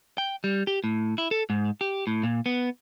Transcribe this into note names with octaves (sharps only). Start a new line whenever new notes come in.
G5
G3
G4
A2
E4
A4
G#2
G4
A2
A#2
B3